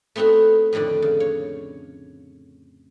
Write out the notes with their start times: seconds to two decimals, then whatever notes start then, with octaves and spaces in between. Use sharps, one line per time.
0.16 A3 B3 C4 D#4 F#4
0.73 F2 A2 D3 D#3 D5
1.02 C#3
1.20 C#5